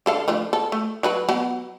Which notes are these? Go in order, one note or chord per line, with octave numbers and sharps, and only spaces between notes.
D3 A4 F5
D3 F3 A3
A4
A3
F#3 F#4 B4
F#3 B3